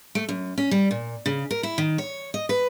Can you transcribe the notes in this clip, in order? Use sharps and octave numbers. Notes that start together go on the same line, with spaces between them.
A3
F#2
C#4
G3
A#2
C#3
A#4
E4
D#3
C#5
D#5
B4